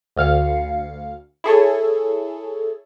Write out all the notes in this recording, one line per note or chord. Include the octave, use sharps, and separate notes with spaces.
D2 F5 C#7
E4 G#4 A4 C#5